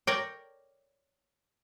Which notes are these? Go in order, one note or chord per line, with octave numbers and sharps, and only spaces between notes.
A#4 C#5 D5 G5